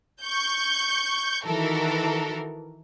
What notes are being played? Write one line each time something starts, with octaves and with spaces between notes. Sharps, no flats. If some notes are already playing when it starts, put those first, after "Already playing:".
C#6 G6
D#3 E3 F#4 A4 A#4